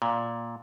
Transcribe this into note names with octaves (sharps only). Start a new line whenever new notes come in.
A#2